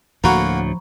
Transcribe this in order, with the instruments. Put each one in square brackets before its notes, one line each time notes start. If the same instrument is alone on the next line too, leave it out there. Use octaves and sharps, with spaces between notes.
[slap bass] D2 A2 [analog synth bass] F3 [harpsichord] A#3 F#4 [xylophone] A#5 B5 C#6